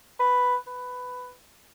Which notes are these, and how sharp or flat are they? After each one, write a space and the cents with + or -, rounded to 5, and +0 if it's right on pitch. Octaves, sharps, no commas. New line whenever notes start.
B4 +5
B4 +15